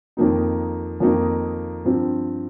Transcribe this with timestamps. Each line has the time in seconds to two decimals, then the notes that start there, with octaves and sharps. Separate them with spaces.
0.17 F2 D#3 A#3 D#4
1.00 F2 D#3 A#3 D#4
1.85 G2 F3 C4